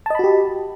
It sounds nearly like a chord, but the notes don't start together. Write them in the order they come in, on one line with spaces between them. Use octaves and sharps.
A5 D#5 B5 F#4 G4